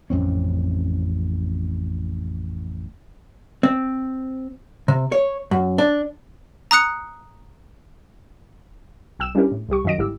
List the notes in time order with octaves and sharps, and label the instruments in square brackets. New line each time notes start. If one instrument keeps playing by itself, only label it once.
[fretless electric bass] A1 F2 C4 C#4
[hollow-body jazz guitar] C4
C3
C#5
F#2
D4
[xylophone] A#5 D#6 F#6 C#7
[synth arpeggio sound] B1 G5 E6 E7
G3 C#4 D4 E4 G4 A#4
A2
C2 G3 G4 C#6
F#2 D#3 F#3 D#5 A#6 D7
G1 G#2 E4 G4 E6